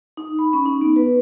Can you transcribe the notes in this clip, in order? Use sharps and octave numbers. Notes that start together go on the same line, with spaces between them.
D#4
B5
C#4
D#4
B3
B4